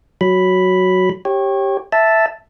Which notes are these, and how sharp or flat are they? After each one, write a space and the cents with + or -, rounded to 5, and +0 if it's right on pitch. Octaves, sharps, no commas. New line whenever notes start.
F#3 +0 B5 +0
G4 +0 C#5 -25
E5 +0 A5 +0